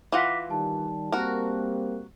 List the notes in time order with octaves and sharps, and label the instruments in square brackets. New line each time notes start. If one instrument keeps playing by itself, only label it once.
[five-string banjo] E3 F4 F#5 [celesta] D6 A#6 B6
[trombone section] D#3 G3 [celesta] A5
[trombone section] G3 A#3 C4 [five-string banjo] F#4 A#4